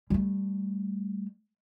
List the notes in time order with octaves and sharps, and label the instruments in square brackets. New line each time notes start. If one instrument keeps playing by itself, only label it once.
[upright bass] G3 A3